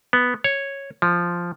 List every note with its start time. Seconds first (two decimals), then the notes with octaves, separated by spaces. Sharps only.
0.13 B3
0.44 C#5
1.02 F3